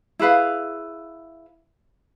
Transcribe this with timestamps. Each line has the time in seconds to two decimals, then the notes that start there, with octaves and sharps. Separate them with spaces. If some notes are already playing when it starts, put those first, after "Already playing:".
0.19 E4 G#4 B4 F5